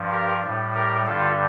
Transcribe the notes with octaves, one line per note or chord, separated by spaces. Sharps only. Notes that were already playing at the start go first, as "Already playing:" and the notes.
Already playing: G2 F3
G4 A#4
A2 G3
G4 A#4
G2 D3 G3 F4 A4